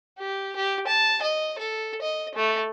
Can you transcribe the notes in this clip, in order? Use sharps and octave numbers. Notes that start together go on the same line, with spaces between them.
G4
G4
A5
D#5
A4
D#5
A3